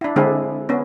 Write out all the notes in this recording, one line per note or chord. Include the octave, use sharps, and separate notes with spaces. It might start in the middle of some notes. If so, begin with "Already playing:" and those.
D4 E4
D3 G#3 C4 D4 E4 G#4
B3 C#4